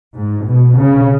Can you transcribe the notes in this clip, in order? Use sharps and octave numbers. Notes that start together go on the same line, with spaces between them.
G#2
B2
C#3